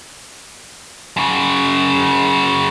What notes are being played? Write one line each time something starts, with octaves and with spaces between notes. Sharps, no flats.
F#2 C#3